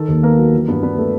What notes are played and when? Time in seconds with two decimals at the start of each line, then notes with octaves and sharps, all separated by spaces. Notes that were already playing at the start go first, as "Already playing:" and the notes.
Already playing: D#3 A4
0.08 D#2
0.23 A#3 B3 A#4
0.38 F#3
0.54 E3
0.68 G2 B3 B4
0.83 B3 D4 B4
0.98 A3 A4